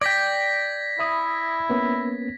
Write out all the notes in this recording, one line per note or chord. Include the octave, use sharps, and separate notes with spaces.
D5 G5 G#6 A#6 B6
E4 E5 B5 D#6
A#3 B3 C#4